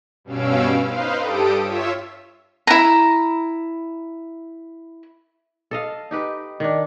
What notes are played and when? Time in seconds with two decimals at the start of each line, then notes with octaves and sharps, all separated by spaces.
0.24 G2 B2 C#4 F5 E6 D7
0.86 D#4 B4 C5 F5
1.15 G2 G4 A4 D#6 D7
1.62 F4 C#5 E5 E6 B6
2.67 E4 A#5
5.71 A4 D#5 F5
6.11 D#4 G4 B4
6.60 D#3 D4